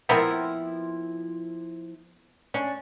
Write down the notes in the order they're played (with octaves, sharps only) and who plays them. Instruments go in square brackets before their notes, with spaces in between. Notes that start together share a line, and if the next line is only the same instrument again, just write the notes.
[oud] F3 E4 E5 [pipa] B3 C4 A#4
[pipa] C#4 [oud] D4